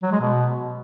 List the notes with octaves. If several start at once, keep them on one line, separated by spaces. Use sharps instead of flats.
F#3
G#3
B2